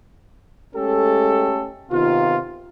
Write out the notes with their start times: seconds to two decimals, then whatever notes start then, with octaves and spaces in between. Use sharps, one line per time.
0.75 G#3 A3 C#4 G4 A4
1.91 C3 D#3 B3 F4